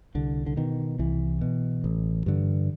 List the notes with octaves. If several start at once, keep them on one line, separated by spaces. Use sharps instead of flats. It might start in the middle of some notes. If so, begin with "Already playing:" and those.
C2 D3
D3
B2 D#3
C2 E3
B2
A1
G2 D3